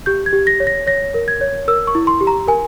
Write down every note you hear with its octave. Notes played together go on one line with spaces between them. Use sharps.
G4 G6
G#6
G4
A#6
C#5
A#6
C#5 A#6
A#4
G#6
C#5
A#4 E6
C#6
E4
C6
G4
A#5
A#4 G#5